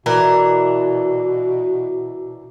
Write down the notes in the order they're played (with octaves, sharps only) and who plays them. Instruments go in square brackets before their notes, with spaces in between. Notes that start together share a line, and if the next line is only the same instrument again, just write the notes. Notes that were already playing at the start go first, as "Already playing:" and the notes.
[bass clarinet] B2 [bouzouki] E3 D4 A#4